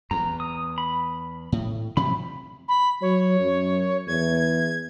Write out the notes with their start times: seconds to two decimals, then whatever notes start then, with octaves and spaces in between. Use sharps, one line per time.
0.11 E2 A#5
0.40 D#6
0.78 B5
1.52 A2
1.97 C3 F3 F#3 B5
2.68 B5
3.02 F#3 C#5
3.40 F#2
4.07 E2 G#6